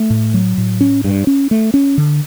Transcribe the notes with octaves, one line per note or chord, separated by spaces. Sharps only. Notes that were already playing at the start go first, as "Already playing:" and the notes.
Already playing: A3
A2
F#3
A2
C#4
G2
C#4
A3
C#4
D3